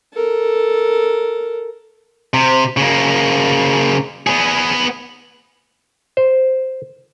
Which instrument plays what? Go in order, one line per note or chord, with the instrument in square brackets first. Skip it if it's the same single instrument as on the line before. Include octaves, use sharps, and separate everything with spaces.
[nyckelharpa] A4 A#4
[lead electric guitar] C3
C#3 A#3
B3 G#4
[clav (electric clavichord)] C5